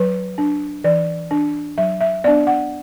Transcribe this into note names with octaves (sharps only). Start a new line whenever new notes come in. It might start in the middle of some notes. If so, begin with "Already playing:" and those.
Already playing: F#3 B4
D4
E3 D5
D4
F#3 E5
E5
B3 D4 D5
F#5